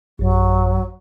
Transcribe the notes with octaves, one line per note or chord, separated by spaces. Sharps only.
A1 F#2 F#3